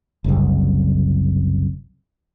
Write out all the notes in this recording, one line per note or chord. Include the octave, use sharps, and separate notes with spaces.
F#1 C2